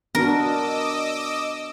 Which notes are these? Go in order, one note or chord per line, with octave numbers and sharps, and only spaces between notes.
B3 D4 F#4 A#4 D#5 D6 E6